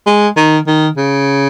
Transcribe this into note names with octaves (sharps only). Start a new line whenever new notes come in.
G#3
D#3
D#3
C#3